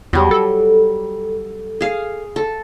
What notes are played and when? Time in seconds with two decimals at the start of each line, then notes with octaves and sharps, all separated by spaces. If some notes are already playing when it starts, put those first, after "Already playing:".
0.13 E2 F#3 G3
0.31 A4
1.81 G#4 F5
2.36 A4